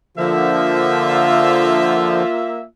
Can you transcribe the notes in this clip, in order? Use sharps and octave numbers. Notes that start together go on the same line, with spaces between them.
D3 F3 A#3 F4 E5